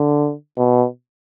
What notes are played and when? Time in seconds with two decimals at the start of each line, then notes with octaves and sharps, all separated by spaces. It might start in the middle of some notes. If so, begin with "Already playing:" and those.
Already playing: D3
0.58 B2